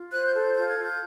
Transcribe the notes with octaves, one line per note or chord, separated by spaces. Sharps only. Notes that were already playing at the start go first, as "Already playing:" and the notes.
Already playing: F4
C5 F#6
G6
A4
G6
F4 G6
G#6
F4
G6